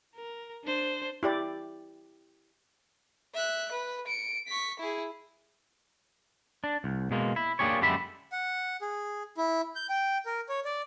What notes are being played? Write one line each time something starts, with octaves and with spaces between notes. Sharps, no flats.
A#4
D4 C5
E4 G4 D5
E5 F#6
B4
C#7 D7
C#6 B6
E4 G#4
D4
C2
B2 G#3 A#3
E4
A#3 D4 G4 G#4 C#5
F#2 D3 G#3 G4 E5 B5
F#5
G#4
E4
G6
G5
A#4
C#5
D5